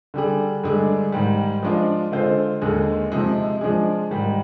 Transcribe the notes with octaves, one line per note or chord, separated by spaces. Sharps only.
D3 G3 D4 G#4
G2 D3 G#3 D4 G#4
G#2 D#3 G3
F3 G#3 D4 F4
D3 G#3 C4 F4 C5
D#2 D3 G#3 D#4 G#4
F2 C3 F3 G#3 D#4
F3 G#3 D4 G#4
G#2 D#3 G3